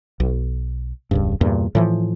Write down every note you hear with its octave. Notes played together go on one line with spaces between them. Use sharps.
B1
E1 C#2 G2
E2 G2 A#2
A2 E3 F3